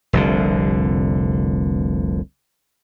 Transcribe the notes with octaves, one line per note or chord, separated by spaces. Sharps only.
F1 C2 D3